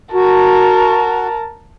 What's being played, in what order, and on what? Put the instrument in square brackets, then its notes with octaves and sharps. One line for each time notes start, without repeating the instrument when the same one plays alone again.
[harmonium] F#4 [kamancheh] A#4 A5